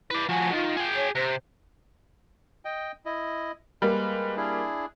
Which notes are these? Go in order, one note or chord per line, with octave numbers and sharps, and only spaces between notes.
E4 B4 D5
F3 F#4 G#5
D#3 F4
G#4 G5
C#5
C3 C5
D#5 G5
E4 D#5
G3 G#3 A#3 B4
D4 E4 G#4